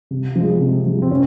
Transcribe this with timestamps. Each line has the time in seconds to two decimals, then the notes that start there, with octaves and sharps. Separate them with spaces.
0.11 C3
0.36 F3
0.41 G#3
0.60 C3
0.86 F3 G#3
1.02 C4
1.10 C3 C#4